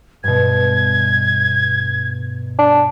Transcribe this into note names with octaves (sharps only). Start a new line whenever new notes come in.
G2 B2 G#6
D4